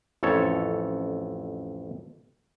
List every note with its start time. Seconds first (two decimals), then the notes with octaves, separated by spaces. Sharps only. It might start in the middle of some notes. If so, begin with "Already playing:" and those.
0.23 A1 F2 A4 C#5